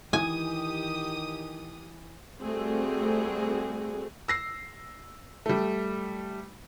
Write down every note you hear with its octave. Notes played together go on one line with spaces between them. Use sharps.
D#3 E3 G4 G#5 D#6
G3 A3 C4 F#4 G#4
E6 A#6 C7
G3 A3